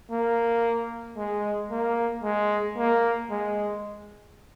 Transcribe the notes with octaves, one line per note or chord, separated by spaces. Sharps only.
A#3
G#3
A#3
G#3
A#3
G#3